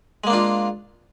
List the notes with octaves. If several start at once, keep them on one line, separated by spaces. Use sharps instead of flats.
G#3 A#3 D4 F4